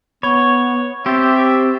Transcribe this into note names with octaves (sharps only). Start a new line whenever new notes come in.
B3 C#5 B5 C#6 G#6
C4 G4 C5 E5 E6 A6